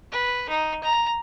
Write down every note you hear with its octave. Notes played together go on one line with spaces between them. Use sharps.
B4
D#4
A#5